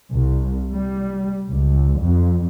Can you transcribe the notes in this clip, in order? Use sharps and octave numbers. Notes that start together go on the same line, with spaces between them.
C2
G3
C#2
F2